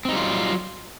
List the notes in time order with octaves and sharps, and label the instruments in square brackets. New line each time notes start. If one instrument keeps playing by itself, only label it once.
[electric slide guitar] C4
D#4
G3
F4
F#3